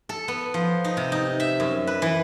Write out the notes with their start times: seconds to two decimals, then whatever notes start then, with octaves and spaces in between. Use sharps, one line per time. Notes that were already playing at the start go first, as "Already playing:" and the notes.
0.09 A4
0.28 B3
0.54 F3
0.84 D#4
0.97 C3
1.12 D#4
1.40 E5
1.60 F#2
1.87 B4
2.02 E3